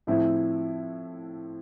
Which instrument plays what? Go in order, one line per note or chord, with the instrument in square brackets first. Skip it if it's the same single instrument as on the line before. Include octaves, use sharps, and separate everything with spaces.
[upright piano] A2 F3 C4 E4